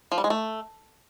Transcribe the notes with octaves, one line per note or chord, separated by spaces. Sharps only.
F3
G3
G#3
A3